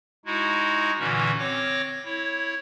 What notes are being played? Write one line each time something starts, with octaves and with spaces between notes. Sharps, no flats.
G#3 D#4 E4 F#4
A#2 D3 E3 C#4 F#4
C4 C#5 D6 A#6
E4 C#5